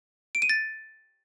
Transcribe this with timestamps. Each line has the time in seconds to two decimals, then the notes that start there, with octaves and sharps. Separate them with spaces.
0.35 D7
0.42 D#7
0.49 A6